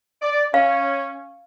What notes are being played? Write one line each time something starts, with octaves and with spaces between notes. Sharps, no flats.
D5
C#4 F5